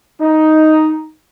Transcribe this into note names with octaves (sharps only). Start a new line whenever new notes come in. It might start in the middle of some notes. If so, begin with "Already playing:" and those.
D#4